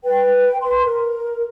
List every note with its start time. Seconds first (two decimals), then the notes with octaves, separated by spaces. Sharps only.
0.04 B4 G5
0.62 B4 C6
0.85 A#4